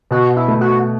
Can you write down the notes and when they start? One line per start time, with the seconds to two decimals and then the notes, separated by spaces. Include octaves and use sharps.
0.11 B2 F#4
0.37 E4
0.48 A3
0.61 F#4